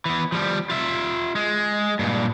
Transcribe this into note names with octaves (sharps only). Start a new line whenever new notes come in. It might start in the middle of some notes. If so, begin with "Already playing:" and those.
E3 B3
F3 G3
F4 E5
G#3
G2 A#2